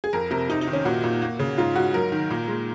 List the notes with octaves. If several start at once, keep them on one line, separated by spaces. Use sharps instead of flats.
G#4
F2 A#4
C3 A#4
C3 D#4
D#4
D#3
C#4
A#2 F#4
A#2
A#3
C#3
G#2 F4
G#2 F#4
F#3 A#4
D#3
A#2
G#3